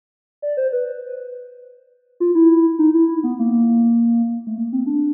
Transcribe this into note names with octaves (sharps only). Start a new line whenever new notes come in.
D5
C5
B4
F4
E4
D#4
E4
E4
B3
A#3
A3
A#3
C4
D4